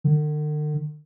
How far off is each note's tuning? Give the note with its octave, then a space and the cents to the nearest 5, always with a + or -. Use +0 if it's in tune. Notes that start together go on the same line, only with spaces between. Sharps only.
D3 +45